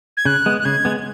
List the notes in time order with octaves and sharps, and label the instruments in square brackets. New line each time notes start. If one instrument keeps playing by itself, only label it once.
[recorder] G#6
[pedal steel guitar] C#3 [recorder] F#6
[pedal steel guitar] G#3 B3
[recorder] F#6
[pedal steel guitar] C#3 [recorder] G#6
[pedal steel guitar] G#3 B3